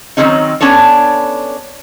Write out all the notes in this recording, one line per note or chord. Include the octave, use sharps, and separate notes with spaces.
D#3 F#3 C4 C#4 D#4
B3 C#4 D4 A4 C#5